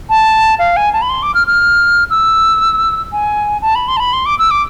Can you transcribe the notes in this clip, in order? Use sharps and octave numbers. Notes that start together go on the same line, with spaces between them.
A5
F5
G#5
A5
B5
C6
D6
F6
F6
E6
G#5
A5
B5
C6
A5
B5
C6
D6
E6
D6